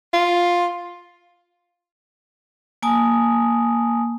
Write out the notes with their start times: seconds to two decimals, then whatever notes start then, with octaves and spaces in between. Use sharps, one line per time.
0.13 F4
2.82 A#3 G#5 A5 D#6